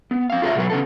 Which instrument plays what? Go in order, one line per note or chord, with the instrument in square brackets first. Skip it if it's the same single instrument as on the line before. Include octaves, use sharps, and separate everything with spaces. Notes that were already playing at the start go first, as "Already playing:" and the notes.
[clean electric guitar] B3
C4 F5
F4 G#4 A#4 C#5 E5
B2 F#3 B4
C#3 B3 A4